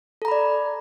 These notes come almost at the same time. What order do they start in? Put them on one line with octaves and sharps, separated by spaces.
A4 A#5 B5 D5